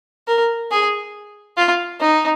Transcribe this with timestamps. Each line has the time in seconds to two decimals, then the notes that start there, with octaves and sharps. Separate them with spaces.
0.28 A#4
0.71 G#4
1.57 F4
2.01 D#4